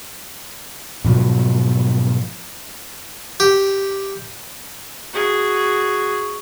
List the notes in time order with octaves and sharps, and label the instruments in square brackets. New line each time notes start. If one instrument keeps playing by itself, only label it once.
[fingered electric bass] G#2 B2 F3 F#3
[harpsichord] G4
[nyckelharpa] F#4 G#4